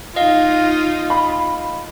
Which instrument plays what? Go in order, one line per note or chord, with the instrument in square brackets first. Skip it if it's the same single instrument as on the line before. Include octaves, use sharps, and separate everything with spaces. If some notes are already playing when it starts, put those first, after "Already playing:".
[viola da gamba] D#4 F4 [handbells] D#5 F5
[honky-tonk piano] B5